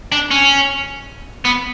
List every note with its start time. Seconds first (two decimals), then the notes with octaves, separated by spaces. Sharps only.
0.12 D4
0.31 C#4
1.45 B3